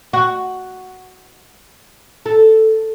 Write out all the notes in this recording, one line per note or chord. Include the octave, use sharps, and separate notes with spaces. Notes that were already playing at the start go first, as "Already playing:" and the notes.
F#4
A4